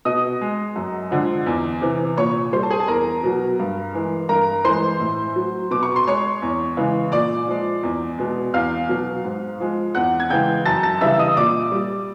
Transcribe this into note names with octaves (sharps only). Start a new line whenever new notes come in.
B2 D#5 D#6
G#3
F#2
D3 F3 G#3
E2
C3 E3
A#2 C#5 C#6
G3 C5 C6
A5
G#4 G#5
A5
E2 A#4 A#5
B2 F#3
G2
E3 G#3
G2 A#4 A#5
E3 G#3 C5 C6
A2
F#3
B2 D6
C#6
C6
G#3 C#5 C#6
E2
C#3 E3 G#3
A#2 D5 D6
F3 G#3
E2
B2 G#3
E2 F5 F6
B2 F#3
G#2
F3 G#3
E2 F#5 F#6
G#6
C#3 E3 G#3 G5 G6
F#2 A5 A6
A5 A6
C#3 E3 G3 E5 E6
D#5 D#6
A#2 D5 D6
G3